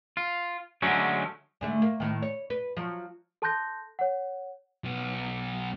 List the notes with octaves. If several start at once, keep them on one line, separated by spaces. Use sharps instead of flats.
F4
D3 F#3 G#3 A3 C#4
G#2 D3 A3
A#3
A2 D#3
C#5
B4
F3 F#3
A4 A5 C6 F#6 G6 A#6
C#5 F#5
B1 B3